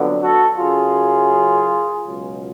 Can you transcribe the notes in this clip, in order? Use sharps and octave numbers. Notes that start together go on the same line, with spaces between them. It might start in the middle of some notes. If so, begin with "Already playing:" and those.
Already playing: F2 D3 F#3 B3
F#4 A4
F#2 C#3 F#3 F4 G#4
C#2 B2 F#3